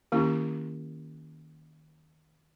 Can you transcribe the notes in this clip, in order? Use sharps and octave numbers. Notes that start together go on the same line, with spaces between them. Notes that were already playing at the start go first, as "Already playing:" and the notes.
D#3 A#3 C#4 E4 G4